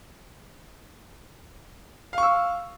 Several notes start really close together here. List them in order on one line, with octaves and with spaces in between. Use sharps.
F5 C#6 E6